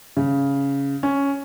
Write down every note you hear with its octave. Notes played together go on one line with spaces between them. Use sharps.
C#3
C#4